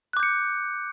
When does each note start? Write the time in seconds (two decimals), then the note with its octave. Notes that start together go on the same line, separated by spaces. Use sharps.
0.13 F#6
0.17 D6
0.20 G6
0.23 C#7